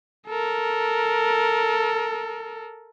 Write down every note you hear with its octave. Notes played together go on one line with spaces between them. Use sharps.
A4 A#4